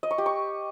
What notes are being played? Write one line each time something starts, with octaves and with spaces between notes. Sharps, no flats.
D#5
C#6
G4
C#6